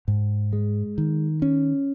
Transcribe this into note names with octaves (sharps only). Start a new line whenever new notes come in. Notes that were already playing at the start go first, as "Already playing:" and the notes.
G#2
G#3
D#3
C#4